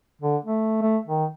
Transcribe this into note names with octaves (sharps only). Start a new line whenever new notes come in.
D3
A3
A3
D#3